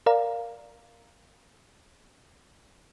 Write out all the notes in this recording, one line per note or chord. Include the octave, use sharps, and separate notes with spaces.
A#4 D5 F5 A#5